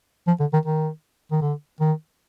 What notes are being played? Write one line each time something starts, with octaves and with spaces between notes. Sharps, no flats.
F3
D3
D#3
D#3
D#3
D3
D#3